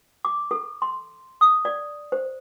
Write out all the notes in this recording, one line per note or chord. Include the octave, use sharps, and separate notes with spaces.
D6
A4
C6
D#6
D5
C5